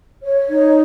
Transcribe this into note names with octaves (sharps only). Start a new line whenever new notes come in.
C#5
D#4